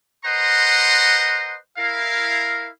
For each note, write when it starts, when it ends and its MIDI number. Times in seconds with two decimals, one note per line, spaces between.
0.25 1.56 71
0.25 1.56 72
0.25 1.56 75
0.25 1.56 78
0.25 1.56 82
0.25 1.56 84
1.78 2.68 64
1.78 2.68 70
1.78 2.68 77